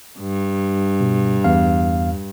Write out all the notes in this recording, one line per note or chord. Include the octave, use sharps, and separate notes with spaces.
G2
B2
E2 F5